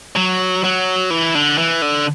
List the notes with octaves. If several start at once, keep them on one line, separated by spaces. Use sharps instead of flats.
F#3
F#3
E3
D3
E3
D3